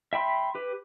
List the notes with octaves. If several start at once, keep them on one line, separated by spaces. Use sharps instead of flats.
E5 G5 B5 C6
G4 B4